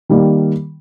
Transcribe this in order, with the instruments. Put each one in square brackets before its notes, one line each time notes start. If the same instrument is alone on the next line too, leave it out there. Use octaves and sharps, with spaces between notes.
[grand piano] D#3 G3 A#3